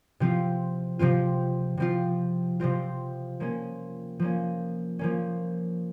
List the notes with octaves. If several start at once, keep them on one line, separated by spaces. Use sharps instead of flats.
C3 F3 C4 F4
C3 F3 C4 F4
C3 F3 C4 F4
C3 F3 C4 F4
F3 A#3 C#4
F3 A#3 C#4
F3 A#3 C#4